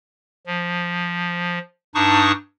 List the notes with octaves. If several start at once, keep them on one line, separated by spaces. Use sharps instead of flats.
F3
G2 D4 D#4 A5 C#6 D#6